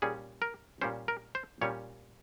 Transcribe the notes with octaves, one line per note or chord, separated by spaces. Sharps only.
A#2 G3 C#4 G#4
A#4
A#2 G3 C#4 C5
A#4
C5
A#2 G3 C#4 C#5